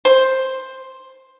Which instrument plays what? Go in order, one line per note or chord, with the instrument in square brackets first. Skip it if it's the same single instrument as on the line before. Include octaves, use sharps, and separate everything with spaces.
[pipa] C5